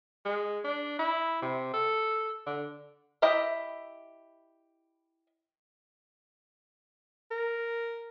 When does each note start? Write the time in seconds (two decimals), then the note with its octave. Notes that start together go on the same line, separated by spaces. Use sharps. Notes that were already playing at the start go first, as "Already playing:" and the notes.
0.25 G#3
0.64 D4
0.99 E4
1.42 C3
1.74 A4
2.47 D3
3.22 E4 G4 D#5 E5
7.31 A#4